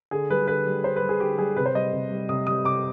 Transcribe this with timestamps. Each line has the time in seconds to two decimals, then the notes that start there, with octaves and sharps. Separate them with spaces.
0.11 D3 G#4
0.30 G3 B4
0.48 D3 B4
0.66 G3
0.84 D3 C5
0.96 B4
1.02 G3
1.09 G#4
1.20 D3 G4
1.38 G3 G#4
1.57 C3 B4
1.66 C5
1.75 G3 D#5
1.93 C3
2.11 G3
2.29 C3 D#6
2.47 G3 D#6
2.65 C3 D6